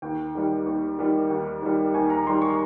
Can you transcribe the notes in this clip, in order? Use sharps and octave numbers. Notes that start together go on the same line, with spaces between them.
D#2 G5
D#3 G3
D#2
D#3 G3
D#2
D#3 G3
D#2 G#5
A#5
D#3 G3 C6
C#6